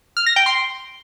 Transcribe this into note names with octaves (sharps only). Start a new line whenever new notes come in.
F6
A#6
G5
C6